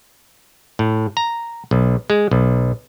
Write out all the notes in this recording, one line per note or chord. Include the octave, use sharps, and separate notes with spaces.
A2
A#5
B1
G#3
B1